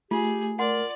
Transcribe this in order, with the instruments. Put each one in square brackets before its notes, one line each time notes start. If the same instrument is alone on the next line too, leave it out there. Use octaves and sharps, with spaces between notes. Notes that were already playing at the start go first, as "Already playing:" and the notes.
[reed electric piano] A3 [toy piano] F4 [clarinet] G4 [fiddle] G#4
[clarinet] A#4 [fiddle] D5 [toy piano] F#5 C6